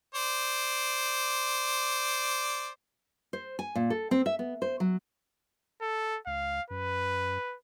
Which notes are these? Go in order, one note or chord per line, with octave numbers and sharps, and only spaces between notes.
C5 D5
C5
G#5
A#2
A4
C4
E5
B3
C5
F#3
A4
C#2 F5
F#2 B4